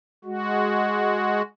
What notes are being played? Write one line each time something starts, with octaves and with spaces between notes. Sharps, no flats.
G#3 F#4